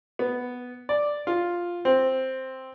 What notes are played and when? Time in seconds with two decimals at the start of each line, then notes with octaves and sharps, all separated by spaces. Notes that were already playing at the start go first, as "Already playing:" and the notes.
0.19 B3
0.89 D5
1.27 F4
1.85 C4